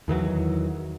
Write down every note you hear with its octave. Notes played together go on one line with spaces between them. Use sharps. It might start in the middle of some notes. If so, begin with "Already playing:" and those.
E2 D#3 E3 F#3